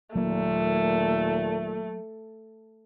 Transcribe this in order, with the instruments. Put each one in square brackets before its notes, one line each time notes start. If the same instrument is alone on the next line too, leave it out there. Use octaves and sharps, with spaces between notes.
[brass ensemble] D#2 A#2 [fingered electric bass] F#3 A#3 [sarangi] A3